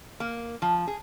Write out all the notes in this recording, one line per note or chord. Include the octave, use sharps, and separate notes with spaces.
A#3
F3
G#4